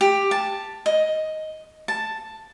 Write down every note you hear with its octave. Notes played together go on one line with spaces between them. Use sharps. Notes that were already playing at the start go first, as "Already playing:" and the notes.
G4
A5
D#5
A5